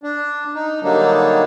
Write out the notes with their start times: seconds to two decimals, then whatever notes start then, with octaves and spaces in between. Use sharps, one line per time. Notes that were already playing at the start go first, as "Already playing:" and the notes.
0.03 D4
0.55 D#4
0.83 D3 F#3 G3 A#3 D4 D#4